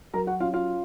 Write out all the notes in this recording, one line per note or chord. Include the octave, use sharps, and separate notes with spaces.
F#3 A#4 A#5
F#4 F#5
C#4 F4 F5
F4 F5